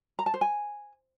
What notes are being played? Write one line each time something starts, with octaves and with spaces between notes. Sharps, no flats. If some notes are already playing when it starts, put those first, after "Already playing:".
A#5
A5
C5
G#5